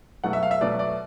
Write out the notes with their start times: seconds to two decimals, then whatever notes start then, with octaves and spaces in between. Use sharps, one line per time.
0.24 B2 F#3 A3 F#5
0.33 E5
0.43 F5
0.51 E5
0.61 B2 F#3 A3 D5
0.79 D5